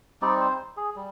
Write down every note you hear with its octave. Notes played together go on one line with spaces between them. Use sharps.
G3 C4 D#4 D5
C5
G#4
G3